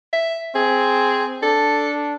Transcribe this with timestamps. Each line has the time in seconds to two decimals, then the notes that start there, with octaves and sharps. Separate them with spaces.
0.13 E5
0.55 C4 G#4
1.43 D4 A4